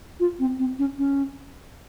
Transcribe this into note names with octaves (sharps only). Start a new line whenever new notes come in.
F4
C4
C4
C#4
C#4